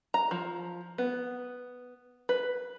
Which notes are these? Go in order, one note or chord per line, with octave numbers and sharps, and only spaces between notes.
A#5
F3
B3
B4